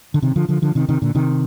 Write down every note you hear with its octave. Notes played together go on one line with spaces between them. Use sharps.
D3
C3 D#3
D3 F3
D3 F3
D3 F3
C3 D#3
C3 D#3
A#2 D3
C3 D#3